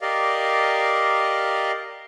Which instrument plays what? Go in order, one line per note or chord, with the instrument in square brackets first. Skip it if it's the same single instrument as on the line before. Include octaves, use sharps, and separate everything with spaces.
[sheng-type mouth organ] G4 A#4 D5 D#5 F5